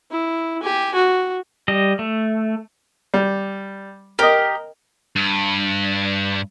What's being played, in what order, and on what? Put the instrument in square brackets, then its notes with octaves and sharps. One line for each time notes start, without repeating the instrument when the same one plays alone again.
[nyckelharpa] E4
G4 G#5
F#4
[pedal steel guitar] G3 D#5
A3
[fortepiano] G3
[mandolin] G4 [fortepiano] A#4 D#5
[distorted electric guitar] G2